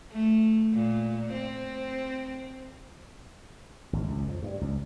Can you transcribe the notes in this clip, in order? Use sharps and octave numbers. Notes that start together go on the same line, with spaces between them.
A3
A#2
C4
G#1
C#2
F2
G2
C#2